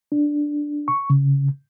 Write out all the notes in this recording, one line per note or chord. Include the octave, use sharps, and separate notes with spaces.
D4
C#6
C#3